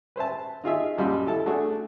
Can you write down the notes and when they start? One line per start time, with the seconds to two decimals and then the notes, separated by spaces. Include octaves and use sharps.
0.16 B4 C5 E5 A5
0.64 D#4 F4 G#4 E5
0.97 A#1 F#2 G3 F#4 D#5 C6
1.27 E4 A4 A5
1.46 A3 D4 F#4 G#4